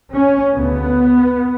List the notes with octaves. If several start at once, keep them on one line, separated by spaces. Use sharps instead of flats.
C#4
D2 C#3 B3